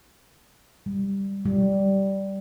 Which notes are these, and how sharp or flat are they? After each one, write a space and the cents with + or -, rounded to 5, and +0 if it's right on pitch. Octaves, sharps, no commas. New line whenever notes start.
G3 +5
G3 -10